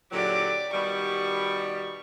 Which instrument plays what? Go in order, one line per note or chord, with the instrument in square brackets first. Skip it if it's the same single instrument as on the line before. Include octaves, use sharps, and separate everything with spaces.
[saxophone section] A#2 D3 F#3 [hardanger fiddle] G4 D5
[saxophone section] B2 D#3 G3 [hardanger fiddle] C#6